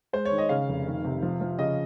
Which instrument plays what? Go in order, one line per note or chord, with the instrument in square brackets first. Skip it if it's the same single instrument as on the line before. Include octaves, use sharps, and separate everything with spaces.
[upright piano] G#3 C5
C#5
D#3
D#5
C#3 F5
F1
D#3
C3
F3
F3
C#3 D#5